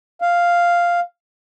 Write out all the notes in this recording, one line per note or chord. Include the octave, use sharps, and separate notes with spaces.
F5